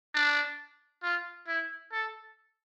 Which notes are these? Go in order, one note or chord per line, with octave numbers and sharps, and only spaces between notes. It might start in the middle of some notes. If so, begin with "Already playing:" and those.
D4
F4
E4
A4